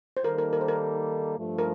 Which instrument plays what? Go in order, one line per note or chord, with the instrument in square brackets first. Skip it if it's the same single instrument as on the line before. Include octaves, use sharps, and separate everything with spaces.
[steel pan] C5
[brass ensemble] D#3 G3 A#3 D#4 A4 [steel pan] A#4
[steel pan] A#4
A#4
C5
A#4
[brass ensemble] G2 F3 A3
[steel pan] A#4